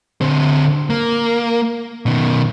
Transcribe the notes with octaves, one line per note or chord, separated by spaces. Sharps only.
D3 C4
A#3
B2 D#3